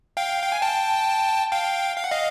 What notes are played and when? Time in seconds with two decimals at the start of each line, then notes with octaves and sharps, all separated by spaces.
0.17 F5 G5
0.42 G5
0.52 G#5
0.62 G5 A5
1.51 F5 G5
1.97 F5
2.04 F#5
2.11 D#5 F5